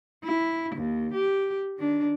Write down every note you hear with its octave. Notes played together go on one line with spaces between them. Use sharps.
E4
D#2
G4
D#3 D4